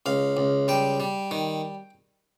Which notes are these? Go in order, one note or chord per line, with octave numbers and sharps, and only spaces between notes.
C#2 F5
C#2
G3 G5
G3
D#3